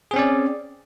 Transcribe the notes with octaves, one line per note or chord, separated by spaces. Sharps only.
C4 C#4 G#4 D5